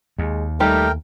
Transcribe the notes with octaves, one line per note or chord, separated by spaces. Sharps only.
D#2 G#3
G3 A3 D#4 G4 A#4 G5